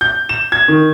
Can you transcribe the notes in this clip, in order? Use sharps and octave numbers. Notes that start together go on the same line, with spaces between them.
G6
E7
G#6
D#3